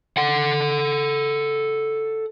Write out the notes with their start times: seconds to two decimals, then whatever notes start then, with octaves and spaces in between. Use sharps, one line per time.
0.17 A4 F#5